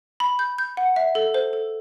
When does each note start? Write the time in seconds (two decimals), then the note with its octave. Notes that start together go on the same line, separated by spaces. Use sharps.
0.20 B5
0.39 G6
0.58 G6
0.77 F#5
0.96 E5
1.15 A4
1.34 C5
1.53 A4